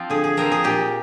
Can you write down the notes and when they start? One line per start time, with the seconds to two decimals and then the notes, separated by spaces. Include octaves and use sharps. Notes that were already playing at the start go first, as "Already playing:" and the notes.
Already playing: F3 C4 F4
0.10 D3 G#4
0.24 G#4
0.37 F3 C4 A#4
0.52 G#4
0.64 A#2 G4